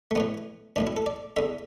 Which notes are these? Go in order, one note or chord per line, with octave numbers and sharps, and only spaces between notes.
A3
A1 A2 E3 B3
B1 A2 E3 D4
E4
A4
D5
E2 D3 E5